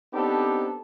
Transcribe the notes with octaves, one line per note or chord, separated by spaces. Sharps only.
B3 C4 D4 D#4 G4 A4